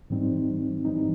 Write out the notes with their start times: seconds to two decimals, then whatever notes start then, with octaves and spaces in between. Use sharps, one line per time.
0.10 G#2 E3 G3 C4 D#4
0.85 G#2 E3 G3 C4 D#4